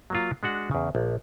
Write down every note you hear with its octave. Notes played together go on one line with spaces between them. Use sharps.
F#3 A#3 F4
G#3 D4 F#4 F#5
E2 C#3
A#1